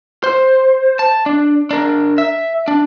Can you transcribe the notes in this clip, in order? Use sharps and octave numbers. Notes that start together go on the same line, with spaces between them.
C5
A5
D4
D4 A#4
E5
D4